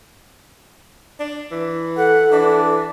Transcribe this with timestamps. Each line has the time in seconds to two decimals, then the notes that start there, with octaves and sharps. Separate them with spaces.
1.20 D4
1.51 E3
1.97 A4 F#5
2.32 E3 D4